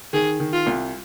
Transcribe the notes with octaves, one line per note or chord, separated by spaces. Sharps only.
D#3 G#4
D#3
F4
C2